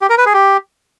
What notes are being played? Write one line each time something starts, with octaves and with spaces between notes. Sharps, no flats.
G4
A#4
B4
G#4
G4